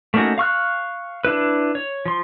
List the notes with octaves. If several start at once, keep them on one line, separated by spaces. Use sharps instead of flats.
A3 A#3 C#4 D#4 F#4
F5 C#6 F6 F#6
D4 E4 B4
C#5
F3 C6